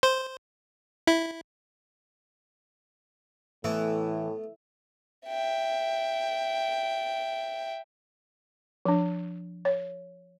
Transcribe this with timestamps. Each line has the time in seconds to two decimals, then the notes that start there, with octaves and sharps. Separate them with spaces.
0.03 C5
1.07 E4
3.64 A2 E3 A3 B3
5.27 E5 G5
8.85 F3 D4
9.65 C#5